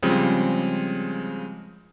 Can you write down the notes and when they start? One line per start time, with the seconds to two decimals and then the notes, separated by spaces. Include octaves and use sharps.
0.02 C#3 F3 G3 G#3 C4